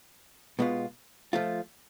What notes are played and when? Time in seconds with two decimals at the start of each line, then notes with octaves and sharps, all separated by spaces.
0.59 B2 G#3 B3 F4
1.33 F3 A3 F4